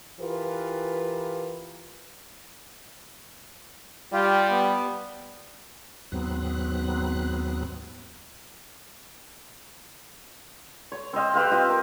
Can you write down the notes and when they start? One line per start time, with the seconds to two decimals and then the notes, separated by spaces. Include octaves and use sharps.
0.20 E3 F4 G4 A#4 B4
4.13 G3 F4 G4
4.50 B3
6.12 D#2 G#2 F#3 B3 C4 F#6
10.92 C#5
11.13 C4 C5 D#5 F5
11.34 G4 B4 C5 F5
11.51 C4 F4 D#5
11.70 A#4